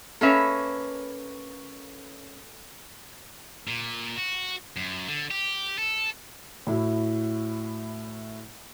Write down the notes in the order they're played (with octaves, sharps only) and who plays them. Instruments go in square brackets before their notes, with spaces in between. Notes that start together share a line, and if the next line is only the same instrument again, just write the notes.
[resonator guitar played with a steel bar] A#3 C#4 E5 [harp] A4 B4 C#5
[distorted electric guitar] A#2
F#4
F#2
D3
G4
A4
[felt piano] A2 E4 F#4